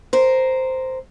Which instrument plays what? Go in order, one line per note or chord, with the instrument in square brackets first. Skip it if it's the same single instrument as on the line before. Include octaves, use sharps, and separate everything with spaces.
[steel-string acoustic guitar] A#4 C5